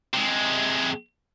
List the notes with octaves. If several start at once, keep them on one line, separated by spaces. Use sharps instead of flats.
C3 G#3